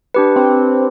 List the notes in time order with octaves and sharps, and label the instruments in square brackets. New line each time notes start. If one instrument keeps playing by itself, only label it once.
[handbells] D4 G4 B4
[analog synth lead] C4